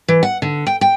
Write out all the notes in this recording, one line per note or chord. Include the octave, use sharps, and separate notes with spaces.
E3
F#5
D3
G5
G5